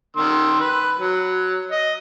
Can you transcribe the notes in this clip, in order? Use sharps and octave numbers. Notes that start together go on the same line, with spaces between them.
D#3 C6 E6
B4
F#3
D#5